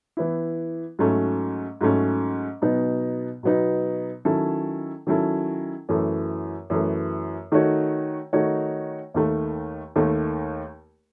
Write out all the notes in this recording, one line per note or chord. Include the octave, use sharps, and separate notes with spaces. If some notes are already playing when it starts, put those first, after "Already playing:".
E3 B3 E4
G#2 F#3 A3 C#4
G#2 F#3 A3 C#4
B2 F#3 B3 D#4
B2 F#3 B3 D#4
D#3 F#3 C#4 E4 A4
D#3 F#3 C#4 E4 A4
F#2 E3 A3
F#2 E3 A3
D#3 A3 D#4 F#4 C#5
D#3 A3 D#4 F#4 C#5
D#2 D#3 A3
D#2 D#3 A3